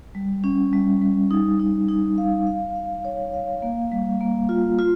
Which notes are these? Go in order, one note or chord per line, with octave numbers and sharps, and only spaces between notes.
G3
C#4
G3
G3
D#4
D#4
D#4
F5
F5
F5
C#5
F5
A#3
G3
A#3
F4
F4